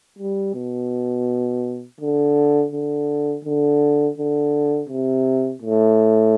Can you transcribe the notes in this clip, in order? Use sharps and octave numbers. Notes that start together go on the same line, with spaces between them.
G3
B2
D3
D3
D3
D3
C3
A2